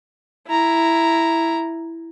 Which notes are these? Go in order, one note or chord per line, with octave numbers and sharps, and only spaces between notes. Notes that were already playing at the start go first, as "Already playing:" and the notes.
E4 A#5